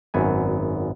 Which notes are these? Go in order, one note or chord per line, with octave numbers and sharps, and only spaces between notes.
G#1 F#2 B3 G#5